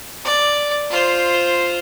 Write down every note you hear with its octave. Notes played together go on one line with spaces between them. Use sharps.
D5
F4 C5